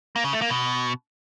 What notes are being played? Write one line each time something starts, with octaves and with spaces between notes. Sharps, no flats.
A#3
C#3
A3
A#3
B2